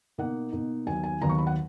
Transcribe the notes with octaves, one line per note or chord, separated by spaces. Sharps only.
B2 A#3 D#4 F#5
B2 A#3 D#4
D#2 D#3 F#3 B3 G#5
G#5
D#2 D#3 F#3 B3 A#5
C#6
B5
F#5